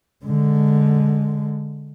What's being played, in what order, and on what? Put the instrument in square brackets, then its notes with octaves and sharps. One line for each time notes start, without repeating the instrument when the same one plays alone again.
[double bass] D3 G#3